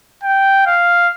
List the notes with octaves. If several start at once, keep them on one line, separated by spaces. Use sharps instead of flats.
G5
F5